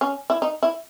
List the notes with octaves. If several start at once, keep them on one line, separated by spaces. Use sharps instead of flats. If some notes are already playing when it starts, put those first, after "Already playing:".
C#4
E4
D#4
E4